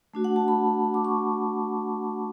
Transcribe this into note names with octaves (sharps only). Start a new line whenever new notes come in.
A3 D4 F#4
F#5
A5
B5
D6
C#6